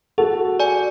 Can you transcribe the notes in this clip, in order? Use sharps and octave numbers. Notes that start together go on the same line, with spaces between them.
F#4 G#4 A4
D5 G#5